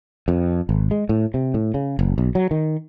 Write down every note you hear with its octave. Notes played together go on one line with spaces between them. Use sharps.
F2
G#1
G#3
A2
C3
A2
C#3
F#1
B1
F#3
D#3